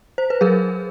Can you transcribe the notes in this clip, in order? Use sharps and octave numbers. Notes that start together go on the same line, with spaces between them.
C5
B4
F#3 G#4 A#4